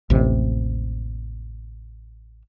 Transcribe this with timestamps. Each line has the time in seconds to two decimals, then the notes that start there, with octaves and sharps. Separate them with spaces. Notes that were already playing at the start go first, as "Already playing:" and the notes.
0.10 A1 D#2 C3